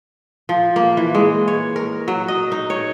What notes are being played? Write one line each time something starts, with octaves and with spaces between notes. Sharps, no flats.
F3
A#3
E3
G#3
C#5
A#4
F#3
D#5
D#4
C#5